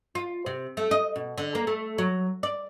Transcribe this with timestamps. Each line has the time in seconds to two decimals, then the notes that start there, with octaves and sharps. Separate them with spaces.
0.15 F4
0.46 C3
0.77 A3
0.91 D#5
1.16 B2
1.38 D3
1.55 A#3
1.67 A3
1.98 F#3
2.43 D5